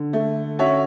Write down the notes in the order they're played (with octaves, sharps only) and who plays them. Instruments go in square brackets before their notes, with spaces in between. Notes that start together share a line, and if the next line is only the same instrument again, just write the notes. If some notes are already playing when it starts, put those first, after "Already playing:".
Already playing: [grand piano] D3
[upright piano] A3
C#4 F#4 C#5 E5